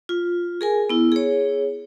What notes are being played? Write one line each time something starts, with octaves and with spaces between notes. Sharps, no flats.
F4
G#4 A#4 G#5
B3 E4
G#4 C#5